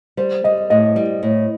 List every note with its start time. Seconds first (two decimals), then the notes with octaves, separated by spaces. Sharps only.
0.17 G3 C5
0.44 G3 D#5
0.70 A2 D#5
0.96 G3
1.23 A2